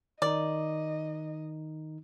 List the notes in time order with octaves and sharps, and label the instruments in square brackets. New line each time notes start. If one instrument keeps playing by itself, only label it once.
[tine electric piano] D#3 D#4 [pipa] D5 [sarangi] D#5